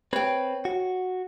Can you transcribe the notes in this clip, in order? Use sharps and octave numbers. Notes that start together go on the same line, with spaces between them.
C4 B4 C#5 G5
F#4